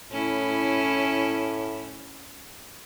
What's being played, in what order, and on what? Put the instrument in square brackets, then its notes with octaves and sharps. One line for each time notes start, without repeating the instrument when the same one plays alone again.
[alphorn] A2 [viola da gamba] C#4 E4